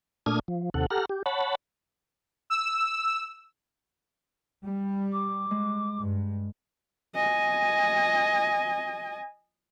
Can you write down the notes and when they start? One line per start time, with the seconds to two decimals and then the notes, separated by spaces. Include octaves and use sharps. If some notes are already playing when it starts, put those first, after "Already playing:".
0.26 A#2 A3 D4 D#6 F6 G#6
0.48 F3
0.74 D#2 C3 A4 F#5
0.91 G4 A4 F#5 A#5 F6
1.09 G4
1.26 C#5 F#5 A5 B5
2.50 E6
4.65 G3
5.12 D6
5.51 G#3
5.99 G2
7.15 D#5 G#5